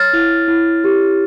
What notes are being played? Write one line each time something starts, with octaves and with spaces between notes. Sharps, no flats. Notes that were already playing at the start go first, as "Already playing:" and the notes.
Already playing: C#5 F6 A6
E4
E4
G4